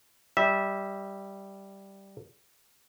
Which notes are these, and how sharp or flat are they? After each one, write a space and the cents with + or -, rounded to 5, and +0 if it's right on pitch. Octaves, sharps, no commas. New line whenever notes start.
G3 +0 E5 -15